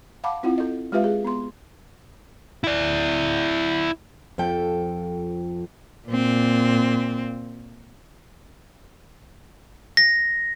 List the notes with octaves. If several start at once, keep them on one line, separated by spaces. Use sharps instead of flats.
F5 F#5 A5 B5 D6
C4 E4 F4 F#5
A4 D#5
G#3 F4 G4 B4 E5 F5
G#4
B3 C6
E4 D5
F2 F3 A4 G5
A#2 C4
A#6